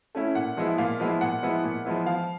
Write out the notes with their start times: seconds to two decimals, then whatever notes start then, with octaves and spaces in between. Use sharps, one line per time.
0.15 A3 C#4 E4
0.35 A#2 F#5
0.57 F3 G#3 B3 E4
0.78 A#2 F5
1.00 F3 G#3 B3 E4
1.21 A#2 F#5
1.42 F3 G#3 B3 E4
1.64 A#2
1.85 F3 G#3 B3 E4
2.06 F3 F5